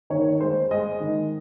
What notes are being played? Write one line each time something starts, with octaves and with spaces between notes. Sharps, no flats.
D#3 C#5
G#3 C5
G#3 D#5
D#3